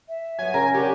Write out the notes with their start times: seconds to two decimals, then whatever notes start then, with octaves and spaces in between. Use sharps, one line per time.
0.09 E5
0.39 F#3 B3 G#5
0.54 C#3 A#4 A#5
0.74 D4 G4 C5 C#5